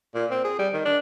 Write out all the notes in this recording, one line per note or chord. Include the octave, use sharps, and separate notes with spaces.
A#2
C4
G#4
G3
D#3
D4